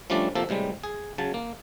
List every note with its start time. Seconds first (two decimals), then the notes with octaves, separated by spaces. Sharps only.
0.10 F3 G3 A3 C#4 D4 D5
0.35 C3 F3 A#3 A4
0.49 A2 C3 G3 G#3
0.84 G#4
1.18 C#3 F#3 A5
1.34 A#3